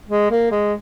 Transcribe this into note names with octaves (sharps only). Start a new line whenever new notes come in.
G#3
A#3
G#3